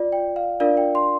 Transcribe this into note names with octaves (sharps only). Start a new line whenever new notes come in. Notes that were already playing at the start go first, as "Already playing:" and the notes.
Already playing: F4 D5
G5
F5
D4 F4 A#4 D5 F5
G5
C6